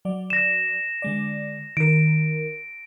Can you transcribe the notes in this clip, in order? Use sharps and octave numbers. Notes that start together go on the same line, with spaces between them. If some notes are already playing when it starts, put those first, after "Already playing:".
F#3 D5
A#6 E7
D3 G#3 D5
D#3 A#4 D7